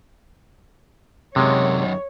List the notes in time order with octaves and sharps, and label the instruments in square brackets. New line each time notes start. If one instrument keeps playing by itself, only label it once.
[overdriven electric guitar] F#2 D#3 [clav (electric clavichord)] C3 G#3 [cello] C#5